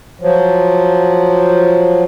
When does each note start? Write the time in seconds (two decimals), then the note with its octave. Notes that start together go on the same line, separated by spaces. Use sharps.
0.21 F3 F#3